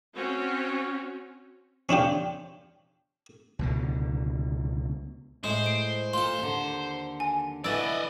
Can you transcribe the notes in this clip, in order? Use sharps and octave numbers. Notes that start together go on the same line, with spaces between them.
C4 C#4 F#4
C#4 D4 F4 G4
C#2 B2 D3
A2 G#3 C5
D7
A#2 A#3 F4 A4 C6
D#2 D3
G#5
D3 E3 B4 D5 D#5 E6 A6